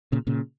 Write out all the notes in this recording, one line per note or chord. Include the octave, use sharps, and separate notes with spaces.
A#2 C#3
A#2 C#3